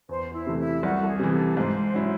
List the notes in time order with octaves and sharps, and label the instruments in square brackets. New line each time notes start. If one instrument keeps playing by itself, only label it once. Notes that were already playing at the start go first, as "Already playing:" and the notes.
[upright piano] E2 [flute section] C5
[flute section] E4
[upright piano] C3 E3 A3
[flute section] E4
[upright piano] C2 [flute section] F#4
[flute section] A4
G#4
[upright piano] C3 E3
[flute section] A4
A4
[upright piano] G#2 [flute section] C5
[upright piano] F#3 C#4 E4